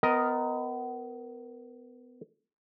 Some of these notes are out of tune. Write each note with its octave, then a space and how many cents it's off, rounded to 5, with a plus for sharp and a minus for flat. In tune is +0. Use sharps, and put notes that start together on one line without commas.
B3 +30 A#4 +0 D#5 +0